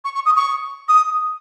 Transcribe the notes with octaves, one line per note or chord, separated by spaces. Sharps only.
C#6
C#6
D#6
C#6
D#6